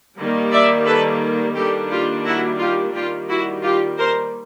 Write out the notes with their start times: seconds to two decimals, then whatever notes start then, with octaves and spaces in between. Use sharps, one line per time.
0.18 D#3 G3 A#3
0.52 D5 E5
0.87 A4 B4
1.55 D#3 G3 A#3 D4 G4 A4
1.91 F4 G4
2.25 E4 F#4
2.59 F4 G4
2.94 D#3 G3 A#3 F4 G4
3.29 E4 F#4
3.63 F4 G4
3.98 A#4 C5